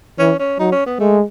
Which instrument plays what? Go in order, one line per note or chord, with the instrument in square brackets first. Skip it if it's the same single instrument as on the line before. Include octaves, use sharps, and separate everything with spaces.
[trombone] E3 [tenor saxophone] C#4
[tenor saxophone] C#4
[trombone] F#3 [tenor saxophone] D#4
[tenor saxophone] C#4
B3
[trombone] G#3 [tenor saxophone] A3